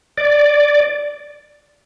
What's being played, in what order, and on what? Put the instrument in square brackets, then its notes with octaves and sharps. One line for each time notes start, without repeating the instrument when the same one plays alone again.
[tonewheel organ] D5